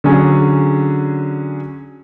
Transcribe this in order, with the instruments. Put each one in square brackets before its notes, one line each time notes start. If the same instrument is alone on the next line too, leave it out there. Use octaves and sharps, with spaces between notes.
[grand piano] D3 F#3 C#4 G#4